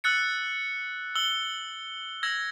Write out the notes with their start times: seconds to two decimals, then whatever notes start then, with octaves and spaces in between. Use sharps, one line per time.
0.04 E6 F#6 A6 C#7
1.15 E6 G7
2.23 E6 G#6 A#6